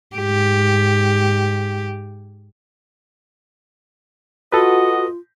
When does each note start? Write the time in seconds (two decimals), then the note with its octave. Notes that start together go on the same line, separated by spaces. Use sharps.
0.16 G#2 G4
4.52 F4 F#4 A4 B4 D#5